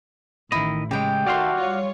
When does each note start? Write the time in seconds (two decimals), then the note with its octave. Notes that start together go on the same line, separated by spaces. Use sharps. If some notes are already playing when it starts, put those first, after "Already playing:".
0.52 A1 D#3 E4 D#5
0.91 C#3 G#3 G4 G5
1.27 D#3 A3 F#4 D5 F5 C6
1.56 G3 F4 C#5